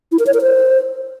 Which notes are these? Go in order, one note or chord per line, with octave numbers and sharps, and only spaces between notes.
E4
A#4
C#5
A#4
C5